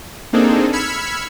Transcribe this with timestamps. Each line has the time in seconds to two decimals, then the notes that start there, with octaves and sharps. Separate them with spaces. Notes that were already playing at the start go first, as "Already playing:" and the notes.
0.33 A#3 C4 D4 D#4 G#4 A4
0.73 B5 E6 F6 G#6 B6 C#7